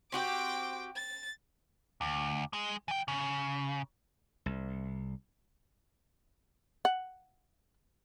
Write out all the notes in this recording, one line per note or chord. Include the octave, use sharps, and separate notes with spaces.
C4 F#4 G4 G5 D6
A6
D2
G#3 G#4
E3 G5
C#3
C2
F#5